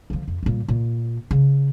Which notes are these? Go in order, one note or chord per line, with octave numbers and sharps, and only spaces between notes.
D3 F3
F2
A#2 G3
A#2
C#3